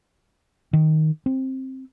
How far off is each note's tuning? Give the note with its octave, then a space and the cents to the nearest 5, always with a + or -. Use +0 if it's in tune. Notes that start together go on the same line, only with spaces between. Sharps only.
D#3 +5
C4 +10